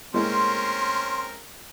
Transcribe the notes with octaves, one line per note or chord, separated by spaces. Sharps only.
A2 G#3 A#3 C4 C#4 A#4 C6